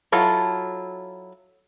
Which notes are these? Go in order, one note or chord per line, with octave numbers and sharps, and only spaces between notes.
F#3 E4 F4 A4